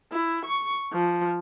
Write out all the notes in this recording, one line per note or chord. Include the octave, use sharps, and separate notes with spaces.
E4
C#6
F3